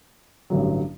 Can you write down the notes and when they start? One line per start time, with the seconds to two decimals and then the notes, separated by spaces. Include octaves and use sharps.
0.50 A1 G2 D3 F#3